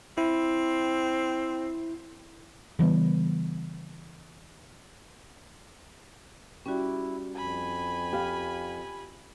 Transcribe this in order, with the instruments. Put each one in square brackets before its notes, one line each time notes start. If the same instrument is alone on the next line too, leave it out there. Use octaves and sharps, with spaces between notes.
[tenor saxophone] C4 [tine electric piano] E4
[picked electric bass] C#3 E3 G3 B3
[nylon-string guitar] G3 G4 [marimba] C#4 F#4 [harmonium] E4
[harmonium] F2 [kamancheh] G#5 B5
[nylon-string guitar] F4 G4 F5